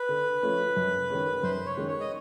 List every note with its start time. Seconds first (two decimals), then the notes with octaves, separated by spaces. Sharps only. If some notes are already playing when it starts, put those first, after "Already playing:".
Already playing: B4
0.09 D3
0.43 F3 A3 C#4
0.76 F#2
1.10 D#3 G#3 C#4
1.43 F#2 C5
1.66 C#5
1.77 D#3 G#3 C#4
1.88 C#5
2.00 D#5